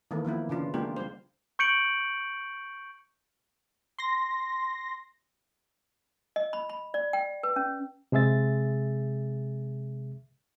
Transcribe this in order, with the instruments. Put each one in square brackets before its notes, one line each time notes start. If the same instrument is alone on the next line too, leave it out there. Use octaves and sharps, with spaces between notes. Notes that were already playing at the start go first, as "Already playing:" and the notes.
[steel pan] D#3 E3 A3 A#3
F3 A#3 B3 E4
C#3 E3 D4 F4
G#3 A#3 B3 D4 F4 G4
G3 C5
[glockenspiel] C#6 G6 C#7 D7 F#7
[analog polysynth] C6 A#6
[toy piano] D#5
B5
B5
D5
G5
B4
C#4
[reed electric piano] C3 G#3 G#4 E5 A6